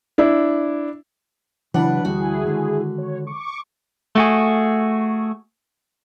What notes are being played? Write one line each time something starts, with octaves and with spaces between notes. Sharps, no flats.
D4 E4
C#3 E3 F#3 D4 B4 F#5 B5
D2 G3 E4 F#4 G#4
D3 D#3 G#3
C#5
C#6 D6
A3 F#4 G#4